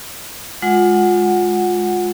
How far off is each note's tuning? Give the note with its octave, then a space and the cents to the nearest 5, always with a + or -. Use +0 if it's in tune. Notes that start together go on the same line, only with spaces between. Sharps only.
G#3 +0 F4 +20 F#5 +0